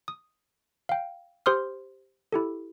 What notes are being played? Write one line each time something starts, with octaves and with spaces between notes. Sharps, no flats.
D#6
F5 G5
G4 C5 C6 D#6 F6
E4 G4 A4